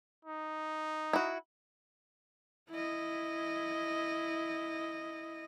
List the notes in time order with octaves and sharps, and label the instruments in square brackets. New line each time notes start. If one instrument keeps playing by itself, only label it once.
[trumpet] D#4
[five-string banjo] E4 F#4
[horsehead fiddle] E4 D#5